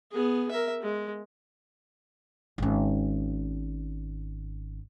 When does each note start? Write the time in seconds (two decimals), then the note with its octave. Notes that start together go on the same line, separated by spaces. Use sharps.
0.11 B3 G#4
0.51 A#4 E5
0.82 G#3
2.58 G#1 C#4